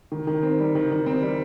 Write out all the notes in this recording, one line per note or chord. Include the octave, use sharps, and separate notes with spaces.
D#3
D#3
C4
G3
D#3
D#3
C4
G3